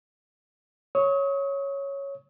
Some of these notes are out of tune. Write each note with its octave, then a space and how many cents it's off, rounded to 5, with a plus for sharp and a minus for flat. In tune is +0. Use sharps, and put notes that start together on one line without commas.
C#5 +0 D#6 +40